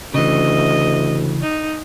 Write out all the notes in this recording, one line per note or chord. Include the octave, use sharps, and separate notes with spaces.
D2 C#3 E3 D#5
D#4